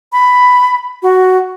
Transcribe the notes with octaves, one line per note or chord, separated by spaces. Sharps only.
B5
F#4